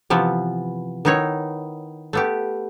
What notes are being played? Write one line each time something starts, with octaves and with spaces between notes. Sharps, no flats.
C3 E3 F3 B3
D#3 B3 D#4 E4 C#5
A3 B3 G4